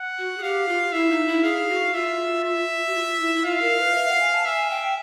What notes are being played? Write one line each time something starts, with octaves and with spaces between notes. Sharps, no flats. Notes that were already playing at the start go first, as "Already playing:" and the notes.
Already playing: F#5
F#4
G#4
G4 F5
F4
E4 E5
D#4
E4
G#4 F5
F#4
F4 E5
E5
F#4
F4
E4
E4
F4 F5
A#4
B4
E5
F#5
G#5
A5
E5 G#5
G5